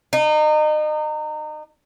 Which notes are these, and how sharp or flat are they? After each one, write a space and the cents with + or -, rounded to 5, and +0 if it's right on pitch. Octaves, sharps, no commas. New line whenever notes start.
D#4 -30